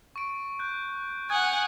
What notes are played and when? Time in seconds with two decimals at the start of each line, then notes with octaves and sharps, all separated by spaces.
0.16 C#6 D7
0.59 F#6 G6
1.30 F#5 G#5 D#6 F#6 G#6